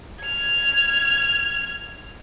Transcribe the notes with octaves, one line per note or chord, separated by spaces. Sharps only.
F6 G#6